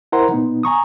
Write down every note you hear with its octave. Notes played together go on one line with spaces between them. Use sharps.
E4 A#4 C5 F#5 A#5 C6
A#2 B3 D#4
G#5 A#5 C#6 D#6